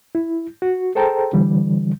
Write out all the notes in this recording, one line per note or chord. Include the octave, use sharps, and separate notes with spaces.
E4
F#4
G#4 A4 C5 G5 A5 A#5
D3 E3 G3